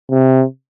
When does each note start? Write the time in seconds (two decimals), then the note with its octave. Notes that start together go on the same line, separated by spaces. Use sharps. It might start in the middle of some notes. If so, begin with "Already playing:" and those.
0.11 C3